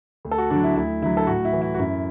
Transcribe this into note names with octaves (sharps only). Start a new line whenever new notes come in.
D2
A4
F#4
D3 F#3 D4
E4
D2 E4
D3 F#3 E4
A4
A2 F#4
E4
E3
E4
F#4
F#2 E4